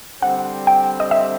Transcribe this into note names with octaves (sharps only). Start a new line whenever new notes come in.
D3 G3 C4 F#5
G5
D#5
E5